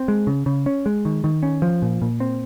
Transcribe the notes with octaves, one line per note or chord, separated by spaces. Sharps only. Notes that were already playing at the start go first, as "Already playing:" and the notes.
Already playing: C4
G#3
C#3
C#3
C#4
G#3
D#3
D#3
C#4
F3
A#2
A#2
C4